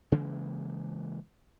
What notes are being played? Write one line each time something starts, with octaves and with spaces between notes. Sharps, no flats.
C#3 E3 G#3 A#3